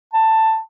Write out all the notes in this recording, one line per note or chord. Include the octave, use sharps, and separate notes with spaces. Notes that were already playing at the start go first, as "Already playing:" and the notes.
A5